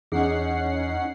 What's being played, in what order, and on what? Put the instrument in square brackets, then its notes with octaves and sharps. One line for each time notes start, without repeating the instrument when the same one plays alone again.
[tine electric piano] E2 [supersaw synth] C#4 F#5 C7 [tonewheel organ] D#4 [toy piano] G#4